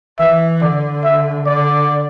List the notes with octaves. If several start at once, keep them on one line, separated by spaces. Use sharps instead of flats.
E3 E5
D3 D5
E5
D3 D5